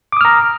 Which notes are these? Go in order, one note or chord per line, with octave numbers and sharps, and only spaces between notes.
A#5 D6 D#6 F6